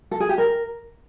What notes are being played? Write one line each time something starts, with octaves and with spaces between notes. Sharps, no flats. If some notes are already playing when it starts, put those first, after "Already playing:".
A4
G#4
G4
A#4